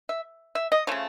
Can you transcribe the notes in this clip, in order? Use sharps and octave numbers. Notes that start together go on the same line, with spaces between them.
E5
E5
D#5
C#3 F3 A3 C#5